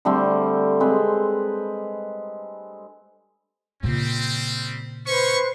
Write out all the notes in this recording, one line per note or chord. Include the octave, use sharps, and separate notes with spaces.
D3 G3 A3 C4
G#3 C4 B4
A#2 C#3 G3 C4
C#4 B4 C5 C#6